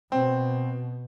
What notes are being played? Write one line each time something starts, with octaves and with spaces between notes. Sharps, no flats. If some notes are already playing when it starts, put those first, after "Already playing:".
B2 C4